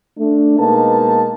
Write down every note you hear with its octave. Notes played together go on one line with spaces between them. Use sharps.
A3 D4
B2 G#3 A#3 D#4 B4 A5